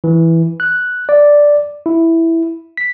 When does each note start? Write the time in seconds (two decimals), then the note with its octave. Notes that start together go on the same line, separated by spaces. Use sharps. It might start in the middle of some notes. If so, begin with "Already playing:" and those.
0.04 E3
0.60 F#6
1.09 D5
1.86 E4
2.77 B6